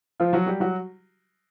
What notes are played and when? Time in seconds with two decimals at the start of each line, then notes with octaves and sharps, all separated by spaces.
0.20 F3 F4
0.33 F#3 F#4
0.46 G3 G4
0.60 F#3 F#4